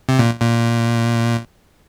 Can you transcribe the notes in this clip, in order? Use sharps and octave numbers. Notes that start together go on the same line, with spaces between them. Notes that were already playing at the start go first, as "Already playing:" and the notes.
C3
A#2
A#2